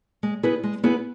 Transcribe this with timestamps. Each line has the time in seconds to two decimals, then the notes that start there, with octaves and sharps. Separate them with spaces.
0.23 G#3
0.43 B3 E4 G#4 B4
0.64 G#3
0.84 B3 E4 G#4 B4